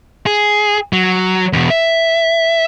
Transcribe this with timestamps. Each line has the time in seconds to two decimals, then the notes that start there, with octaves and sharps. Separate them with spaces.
0.26 G#4
0.93 F#3
1.53 E2 B2
1.70 E5